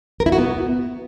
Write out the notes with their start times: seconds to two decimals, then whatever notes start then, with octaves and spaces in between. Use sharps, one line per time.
0.20 A#4
0.26 E4
0.32 F#4
0.38 B3